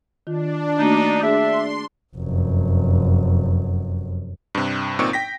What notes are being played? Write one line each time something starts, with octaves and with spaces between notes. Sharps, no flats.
D#3 D4 F4
A3 A#3 D#4 F#4
D4 G#4 E5 C6
F1 F#2
G2 C3
G1 A#2 C4 D#4 C#6
G5 A#6 B6